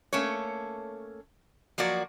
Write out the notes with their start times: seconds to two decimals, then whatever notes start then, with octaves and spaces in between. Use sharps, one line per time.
0.13 A3 A#3 C#4 C#5
1.78 F3 F#3 A#3 F#4 D5